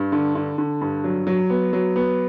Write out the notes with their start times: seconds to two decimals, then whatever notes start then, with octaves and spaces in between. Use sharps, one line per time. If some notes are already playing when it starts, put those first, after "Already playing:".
Already playing: G2
0.12 D3
0.35 D3
0.58 D3
0.81 G2
1.04 F#3
1.27 F#3
1.50 B3
1.73 F#3
1.96 B3